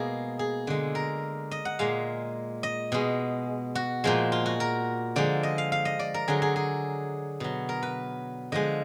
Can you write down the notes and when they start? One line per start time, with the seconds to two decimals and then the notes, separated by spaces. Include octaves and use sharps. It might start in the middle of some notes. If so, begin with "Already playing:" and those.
Already playing: B2 G#3 A#3 G#4
0.39 G#4
0.67 D3 G#3
0.95 A#4
1.51 D#5
1.65 F#5
1.79 A#2 G#3 F5
2.63 D#5
2.92 B2 G#3
3.75 F#4
4.04 A#2 F3 G#3
4.32 F4
4.46 F#4
4.60 A#4
5.16 D3 F3 G#3 D5
5.43 D#5
5.58 F5
5.72 F5
5.85 D#5
5.99 D5
6.14 A#4
6.28 D3 F#3 G#4
6.42 G#4
6.56 G#4
7.40 B2 F#3
7.69 A#4
7.83 B4
8.52 D3 F3 G#3 D#5